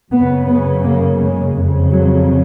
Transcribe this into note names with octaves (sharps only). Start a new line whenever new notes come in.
F#2 C#3 B3
B3
A#3
G#3
F2 C#3
F#3